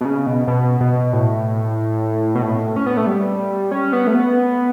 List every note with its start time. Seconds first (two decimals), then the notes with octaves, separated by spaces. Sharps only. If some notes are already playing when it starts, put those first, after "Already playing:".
0.01 B2
0.05 C#3
0.26 B2
0.47 B2
0.80 B2
1.13 A2
2.35 B2
2.42 A2
2.76 C#4
2.86 B3
2.97 A3
3.07 G3
3.71 C#4
3.93 B3
4.07 A3
4.15 B3